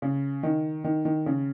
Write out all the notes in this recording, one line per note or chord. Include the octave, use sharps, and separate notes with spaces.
C#3
D#3
D#3
D#3
C#3